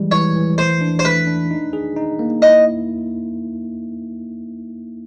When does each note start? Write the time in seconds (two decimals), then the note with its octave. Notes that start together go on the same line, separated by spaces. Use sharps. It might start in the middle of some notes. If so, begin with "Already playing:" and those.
Already playing: E3 G3 G#3
0.11 E3 C#5
0.36 E3
0.58 A3 C5
0.81 D4
0.99 C5
1.05 A3 B4
1.27 D4
1.51 D#4
1.73 G#4
1.96 D#4
2.19 A#3
2.42 E4 D#5